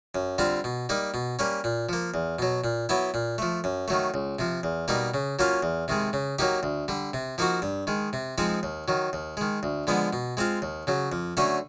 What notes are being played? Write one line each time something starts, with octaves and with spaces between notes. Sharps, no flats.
F#2
D3 G3 C4 F4
B2
G3 A#3 D#4
B2
G3 A#3 C#4
A#2
F3 A#3
E2
B2 F#3
A#2
F#3 B3 E4
A#2
F3 A3
F#2
D#3 F#3 A3
C#2
C3 F3
E2
B2 G3 A#3 D#4
C#3
F#3 A#3 C#4 F4
E2
C3 D#3 G#3
C#3
F#3 A#3 D#4 G4
D2
D3 G3
C3
F3 A#3 D#4 F#4
G2
D#3 G#3
C3
F3 G#3 C4 D#4
D#2
D#3 F#3
D#2
D#3 G#3
D2
D3 F3 G#3 B3
B2
G#3 C4 F4
D#2
C#3 F#3
F2
D3 F#3 A3 C#4